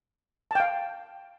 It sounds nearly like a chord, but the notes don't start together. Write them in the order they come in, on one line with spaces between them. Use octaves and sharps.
A5 G5 F5